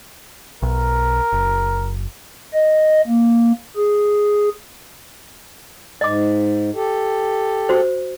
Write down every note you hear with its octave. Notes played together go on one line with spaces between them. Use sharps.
B1 A#4
F#1
D#5
A#3
G#4
G#2 D#5 D6
G4 A4
F#4 C5